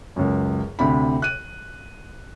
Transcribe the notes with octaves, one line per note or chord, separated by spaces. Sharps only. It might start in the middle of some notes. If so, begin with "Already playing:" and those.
C#2 F#2
D2 C3 B5
F#6 D#7